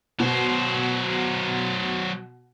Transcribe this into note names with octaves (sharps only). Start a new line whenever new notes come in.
B2 F#3 C5